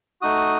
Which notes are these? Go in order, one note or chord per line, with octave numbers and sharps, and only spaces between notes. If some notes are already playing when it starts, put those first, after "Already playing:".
A3 D#4 F#4 D#6